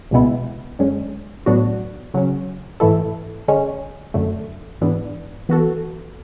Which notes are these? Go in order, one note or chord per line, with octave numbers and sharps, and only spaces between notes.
C#2 B2 G#3 B3 E4
F#2 D3 G#3 C#4
A2 F#3 B3 D4 F#4
C#3 F#3 C#4
G#2 E3 A3 E4 A4
D3 G#3 C#4
F#2 D3 A3
G#2 E3 B3 D4
E3 B3 F#4 A4